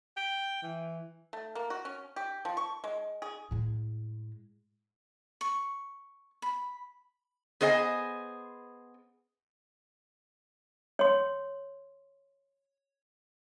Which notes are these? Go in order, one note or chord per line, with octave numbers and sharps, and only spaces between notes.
G5
E3
A3
A#3
F#4
C#4
G4
F3
C#6
G#3
G#4
A2 G#3
C#6
B5
B3 G#4 C5 D#5 E5 G#5
C#5 C6